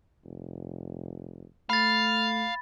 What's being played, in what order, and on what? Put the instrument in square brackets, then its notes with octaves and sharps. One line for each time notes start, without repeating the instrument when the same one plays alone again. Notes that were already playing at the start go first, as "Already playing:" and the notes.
[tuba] F1
[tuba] A3 [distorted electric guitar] F5 [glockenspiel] B5 A6